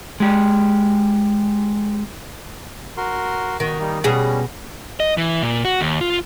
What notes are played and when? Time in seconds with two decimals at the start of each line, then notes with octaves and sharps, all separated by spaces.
0.20 G#3 G4
2.97 F#4 A#4 C6
3.60 B2 D#3 F#4
3.80 G3 A#3 D#4
4.04 B2 G3 C#4 G#4
5.00 D#5
5.17 E3
5.42 A#2
5.65 F#4
5.81 D#2
6.01 F4